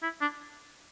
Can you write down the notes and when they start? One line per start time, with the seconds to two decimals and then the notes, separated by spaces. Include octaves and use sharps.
0.03 E4
0.21 D4